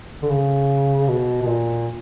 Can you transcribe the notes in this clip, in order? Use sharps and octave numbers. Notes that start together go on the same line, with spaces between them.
D3
C#3
B2
B2
A#2